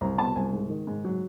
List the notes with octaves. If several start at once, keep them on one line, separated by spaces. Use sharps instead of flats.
C2 A#5
B2 A5
C2 G#5
G#2
D#3
G#2
F#3